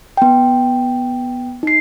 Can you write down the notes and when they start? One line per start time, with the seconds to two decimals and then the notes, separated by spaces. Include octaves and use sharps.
0.17 B3 G5
1.63 D#4 C7